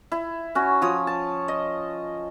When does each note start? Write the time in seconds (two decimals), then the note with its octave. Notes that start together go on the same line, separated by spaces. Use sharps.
0.12 E4
0.55 C#4 F#4
0.82 F3 C#5 D#6
1.07 A5
1.48 D#5